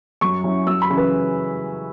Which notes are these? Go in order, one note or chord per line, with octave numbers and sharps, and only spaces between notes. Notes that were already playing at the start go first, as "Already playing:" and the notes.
F#2 C#6
F#3 C#4 E4
F#2 E6
B5
C#3 E3 C#4 E4
B4